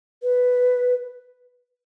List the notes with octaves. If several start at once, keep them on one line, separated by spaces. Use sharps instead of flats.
B4